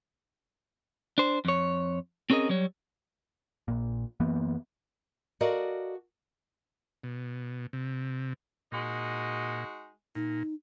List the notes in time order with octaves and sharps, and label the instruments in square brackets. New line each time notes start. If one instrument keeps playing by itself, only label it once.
[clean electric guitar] D4 C5
F2 C#5
C4 C#4 G#4 A#4 D#5
F#3 G3 C#5
[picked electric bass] A#1 A#2
F#2 E3 A#3 B3
[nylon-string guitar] F#4 A4 A#4 D5 D#5 F5
[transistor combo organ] B2
C3
[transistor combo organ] A#2 [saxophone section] G#3 D#4 F#4
[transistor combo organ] A#2 [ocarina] D#4